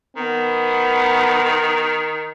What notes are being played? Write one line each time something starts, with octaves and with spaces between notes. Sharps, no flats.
D#3 B3